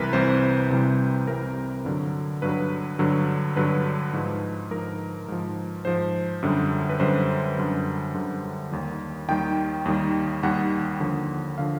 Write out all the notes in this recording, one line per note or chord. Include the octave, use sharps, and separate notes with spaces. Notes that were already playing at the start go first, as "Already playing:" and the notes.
Already playing: C2 C3 E3 G3 A#4 B4
C2 C3 E3 G3 C5
C2 C3 E3 G3
C2 C3 E3 G3 A#4
G2 D3 F#3
G2 D3 F#3 B4
G2 D3 F#3
G2 D3 F#3 B4
G#2 F3
G#2 F3 A#4
G#2 F3
G#2 F3 C5
F#2 D3 G3
B4
F#2 D3 G3 C5
F#2 D3 G3
F#2 D3 G3
D#2 D#3 G3
D#2 D#3 G3 G5
D#2 D#3 G3
D#2 D#3 G3 F#5
D#2 D3 F3
D3 F3 F5